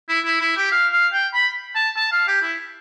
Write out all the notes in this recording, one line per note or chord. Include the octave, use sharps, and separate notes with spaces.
E4
E4
E4
G4
F5
F5
G5
B5
A5
A5
F5
G4
E4